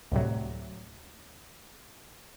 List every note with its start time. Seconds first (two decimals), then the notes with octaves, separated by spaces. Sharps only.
0.12 D2 A2 C3 F#3